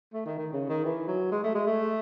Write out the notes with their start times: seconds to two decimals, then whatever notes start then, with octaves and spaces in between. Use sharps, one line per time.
0.14 A3
0.26 D#3
0.38 D#3
0.53 C#3
0.69 D#3
0.85 E3
1.07 F#3
1.31 G#3
1.43 A3
1.55 G#3
1.67 A3